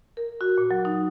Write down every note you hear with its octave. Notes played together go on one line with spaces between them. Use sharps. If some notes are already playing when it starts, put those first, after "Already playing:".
A#4
F#4
A#2
F#3
D#4